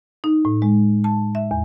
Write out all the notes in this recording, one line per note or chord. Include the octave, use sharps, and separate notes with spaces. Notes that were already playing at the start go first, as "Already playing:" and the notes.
D#4
A2
G#3
A5
E5
E2